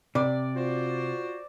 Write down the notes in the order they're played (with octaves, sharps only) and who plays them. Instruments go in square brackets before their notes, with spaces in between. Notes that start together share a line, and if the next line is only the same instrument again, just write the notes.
[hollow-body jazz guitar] C3 [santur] D5
[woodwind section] F4 F#4 C5